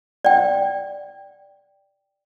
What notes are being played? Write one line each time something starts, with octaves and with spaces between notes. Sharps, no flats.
D5 G5